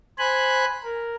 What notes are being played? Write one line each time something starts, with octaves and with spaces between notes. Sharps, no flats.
C5 G#5 B5 F#6
A#4